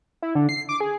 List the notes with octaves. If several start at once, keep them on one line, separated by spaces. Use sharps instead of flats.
E4
D3
C7
D6
G#4